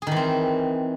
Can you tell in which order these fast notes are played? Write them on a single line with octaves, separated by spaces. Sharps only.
G#4 D#3 E3 C4